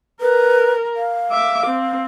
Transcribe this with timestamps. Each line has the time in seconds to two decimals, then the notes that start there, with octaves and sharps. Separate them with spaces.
0.21 A#4 B4
0.96 F5
1.31 E5 D6
1.66 C4